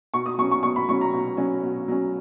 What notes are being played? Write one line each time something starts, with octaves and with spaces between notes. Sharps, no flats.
B2 C#6
D#6
F#3 C#4 C#6
C#6
B2 C#6
B5
F#3 C#4 C#6
A#5
B2
F#3 C#4
B2
F#3 C#4